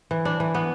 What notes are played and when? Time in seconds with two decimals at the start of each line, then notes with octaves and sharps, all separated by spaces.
0.11 E3
0.25 D4
0.40 E3
0.55 B3